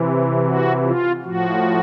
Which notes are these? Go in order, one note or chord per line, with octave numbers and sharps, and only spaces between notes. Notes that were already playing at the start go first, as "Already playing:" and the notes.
Already playing: C3 E3
F#4
F4
A2 F3 F#4